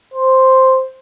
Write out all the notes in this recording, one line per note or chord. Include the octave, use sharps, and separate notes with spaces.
C5